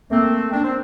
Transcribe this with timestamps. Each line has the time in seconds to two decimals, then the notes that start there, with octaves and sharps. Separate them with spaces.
0.10 A3 A#3 C4
0.52 A#3 D4
0.64 C4